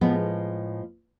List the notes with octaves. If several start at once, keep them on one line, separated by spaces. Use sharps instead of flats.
A2 F3 G#3 B3